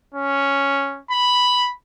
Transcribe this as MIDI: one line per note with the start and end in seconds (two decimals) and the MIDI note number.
0.14 1.00 61
1.11 1.70 83